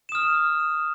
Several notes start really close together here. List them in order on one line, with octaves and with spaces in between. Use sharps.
E7 D#6 F6